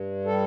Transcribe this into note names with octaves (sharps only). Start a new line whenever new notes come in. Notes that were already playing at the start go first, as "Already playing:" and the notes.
Already playing: G2
G3 A4